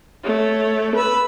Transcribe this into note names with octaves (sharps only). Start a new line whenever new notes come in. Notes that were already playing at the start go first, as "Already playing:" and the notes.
A3 C#5
B4 B5 E6